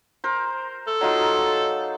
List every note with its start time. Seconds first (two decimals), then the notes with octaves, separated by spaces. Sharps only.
0.24 A#4 C5
0.87 A4
1.01 F#3 D#4 F4